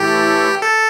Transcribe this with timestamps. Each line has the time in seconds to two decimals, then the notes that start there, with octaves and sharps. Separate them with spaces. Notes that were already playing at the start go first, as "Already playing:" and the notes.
Already playing: A2 E3 A3 E4 G4 A4
0.62 A4